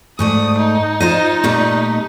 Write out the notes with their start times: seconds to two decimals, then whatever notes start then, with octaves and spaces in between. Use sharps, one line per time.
0.19 G#2 A3 D5 D#6
0.58 D#4
1.00 F4 C5 D#5
1.43 A#2 G3 A3